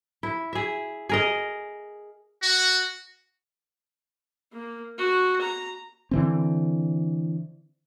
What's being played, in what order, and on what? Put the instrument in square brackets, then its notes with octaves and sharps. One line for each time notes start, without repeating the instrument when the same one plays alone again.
[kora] E4
G#4 E5
G#4 A#4 D#5
[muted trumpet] F#4
[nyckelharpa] A#3
F#4
A#5
[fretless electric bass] D3 E3 C4